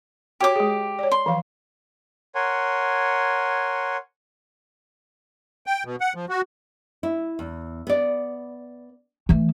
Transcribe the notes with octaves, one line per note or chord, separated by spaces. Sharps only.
F#4 G4 C#5 G5 D6
G#3 G#4
C#5 D5
C6
E3 F3 F5
A#4 C#5 F#5 G#5 C6
G5
B2
F#5
F3
F#4
E4
E2
B3 D5
E3 A3